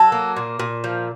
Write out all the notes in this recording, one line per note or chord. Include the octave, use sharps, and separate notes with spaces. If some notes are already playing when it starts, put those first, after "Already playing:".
Already playing: F#3 A4
A#3
A#2
A#2
F3